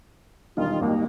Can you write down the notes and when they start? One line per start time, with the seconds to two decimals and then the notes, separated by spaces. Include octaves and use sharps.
0.57 E1 D#3 G3 D#4 F4
0.80 G#1 D#2 A#3